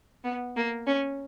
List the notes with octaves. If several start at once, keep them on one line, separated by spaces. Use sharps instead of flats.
B3
A#3
C#4